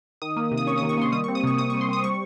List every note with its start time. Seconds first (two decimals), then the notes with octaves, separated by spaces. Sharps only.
0.22 D#3 D#6
0.36 A#3
0.51 C3
0.57 D#6
0.67 C#4 C#6
0.78 D#6
0.82 D#3
0.89 C#6
0.97 A#3 C6
1.12 G3 D#6
1.24 C#6
1.28 C4
1.35 D#6
1.44 C3 C#6
1.58 C3 D#6
1.70 C#6
1.74 G3
1.81 C6
1.89 C4 D#6
2.04 G3 C#6